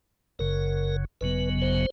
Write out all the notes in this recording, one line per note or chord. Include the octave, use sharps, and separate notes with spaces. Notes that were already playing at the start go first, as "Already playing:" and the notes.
F#1 F#2 C#3 A#4
G#1 F#2 C#3 F#3 B3 B4
C5